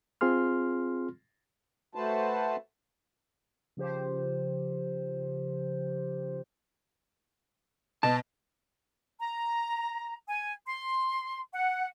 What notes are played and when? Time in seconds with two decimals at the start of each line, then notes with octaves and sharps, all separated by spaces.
0.21 C4 F4 G#4 C6 F6
1.95 A3 F#4 B4 C5 A5
3.77 C#3 F3 G4 C5
8.03 B2 A5
9.19 A#5
10.28 G#5
10.67 C6
11.52 F#5